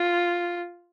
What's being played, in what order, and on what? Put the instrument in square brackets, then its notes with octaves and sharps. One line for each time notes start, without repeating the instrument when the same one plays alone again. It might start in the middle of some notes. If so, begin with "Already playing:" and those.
Already playing: [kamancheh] F4